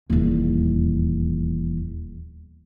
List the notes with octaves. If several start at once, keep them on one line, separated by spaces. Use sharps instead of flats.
D#1 E2